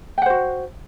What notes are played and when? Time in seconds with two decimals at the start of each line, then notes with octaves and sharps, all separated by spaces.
0.18 G5
0.22 F#5
0.26 C5
0.30 F#4